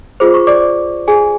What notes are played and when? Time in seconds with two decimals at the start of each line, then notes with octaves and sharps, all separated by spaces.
0.20 F4 G#4 C5 D6
0.34 C#6
0.47 D5 D6
1.08 G#4 G#5